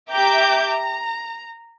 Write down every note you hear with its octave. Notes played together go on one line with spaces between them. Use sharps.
G4 E5 G5 A#5 D6 G6
A#5